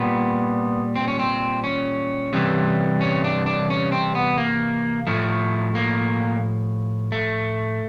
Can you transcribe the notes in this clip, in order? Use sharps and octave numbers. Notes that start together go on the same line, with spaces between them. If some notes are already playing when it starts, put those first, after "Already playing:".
Already playing: A#2 G3 B3
C4
C#4
C4
C#4
C3 E3 G3
C#4
D4
D4
C#4
C4
B3
A#3
A2 F3 A3
A#3
A3